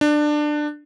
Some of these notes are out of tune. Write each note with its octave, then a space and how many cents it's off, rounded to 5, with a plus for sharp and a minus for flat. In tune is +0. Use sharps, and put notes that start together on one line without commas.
D4 +20